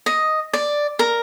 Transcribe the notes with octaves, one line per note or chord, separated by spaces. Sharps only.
D#5
D5
A#4